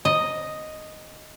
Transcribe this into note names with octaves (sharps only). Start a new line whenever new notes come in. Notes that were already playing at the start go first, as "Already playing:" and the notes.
D#5